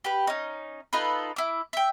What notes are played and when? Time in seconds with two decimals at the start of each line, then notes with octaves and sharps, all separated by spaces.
0.04 G4 B4
0.27 C#4 D#4
0.93 D#4 F4 A4 B4
1.36 E4 D6
1.73 E5 G5